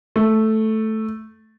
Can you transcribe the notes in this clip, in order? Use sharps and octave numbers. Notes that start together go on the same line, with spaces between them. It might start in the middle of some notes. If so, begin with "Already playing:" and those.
A3